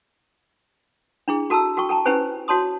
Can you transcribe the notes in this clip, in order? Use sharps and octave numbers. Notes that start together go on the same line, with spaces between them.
D4 E4 G#4
F#4 A4 A5 A#5 E6
F#4 A4 G5 C#6
A4 G5 A5 A#5
C#4 E4 G4 B4 C5 G#5
F#4 C#5 A5 C6 D#6